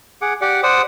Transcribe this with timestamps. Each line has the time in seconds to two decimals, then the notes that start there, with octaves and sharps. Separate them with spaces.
0.22 G#4 F#5 D6
0.41 G4 D5 F#5
0.63 C5 D5 F#5 D#6